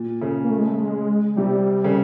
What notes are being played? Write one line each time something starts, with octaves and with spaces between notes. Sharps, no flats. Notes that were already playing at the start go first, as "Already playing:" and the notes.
Already playing: A#2
C#3
A#3
A3
G#3
A3
G#3
C3 G3
C#3